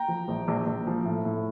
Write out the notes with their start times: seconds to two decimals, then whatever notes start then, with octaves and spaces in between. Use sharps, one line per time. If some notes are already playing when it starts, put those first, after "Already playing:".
Already playing: G5 A#5
0.08 F3
0.28 A#1
0.48 A#1
0.67 A#1
0.87 F3
1.05 A2
1.25 A2